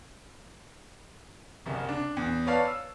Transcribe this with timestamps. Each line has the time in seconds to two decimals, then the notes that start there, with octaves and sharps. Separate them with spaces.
1.66 F#1 C2
1.89 D4
2.17 E2
2.47 B4 C#5 D5 F5 A5
2.67 E6